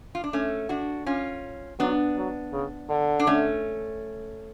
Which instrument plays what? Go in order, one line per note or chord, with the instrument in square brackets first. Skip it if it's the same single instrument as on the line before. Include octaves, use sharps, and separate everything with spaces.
[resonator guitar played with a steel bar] F4
D4
A3 C#4
D4 F#4
C#4 F4
[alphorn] F#3 [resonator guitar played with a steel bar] B3 D4
[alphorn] F#3
C#3
D3
[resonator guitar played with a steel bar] D4
A3 C#4